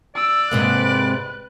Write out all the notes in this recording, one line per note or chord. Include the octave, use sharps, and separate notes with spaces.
D5 E6
G#2 C3 A#3 B4 F#6